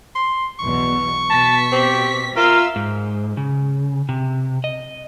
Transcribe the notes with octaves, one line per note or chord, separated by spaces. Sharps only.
C6
B1 E2 B2 C#6
B2 A5 B6
C4 G4
F4 A#4 E5 F5 E6
G#2
C#3
C3
D#5